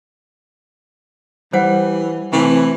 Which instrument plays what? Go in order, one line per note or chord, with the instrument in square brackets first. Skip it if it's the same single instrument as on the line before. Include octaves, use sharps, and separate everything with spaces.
[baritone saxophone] E3 [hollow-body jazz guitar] G3 [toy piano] C5 F#5
[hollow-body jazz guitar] C3 A3 [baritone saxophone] E3